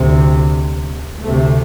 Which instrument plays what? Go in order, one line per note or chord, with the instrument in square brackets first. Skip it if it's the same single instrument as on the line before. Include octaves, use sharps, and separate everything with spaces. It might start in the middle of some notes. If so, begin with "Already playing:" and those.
Already playing: [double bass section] D2 C3
D2 C3 A3